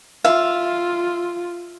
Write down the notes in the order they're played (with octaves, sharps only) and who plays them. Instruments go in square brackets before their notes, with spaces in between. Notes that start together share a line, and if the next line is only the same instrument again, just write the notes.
[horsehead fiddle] F4 [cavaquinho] E5 F5